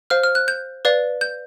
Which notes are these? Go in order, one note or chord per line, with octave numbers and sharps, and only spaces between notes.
C5 F5 F6
F6
F#6
G6
B4 D5 F5
G6